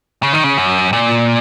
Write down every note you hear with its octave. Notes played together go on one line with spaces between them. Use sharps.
C#3
D#3
C#3
F#2
A#2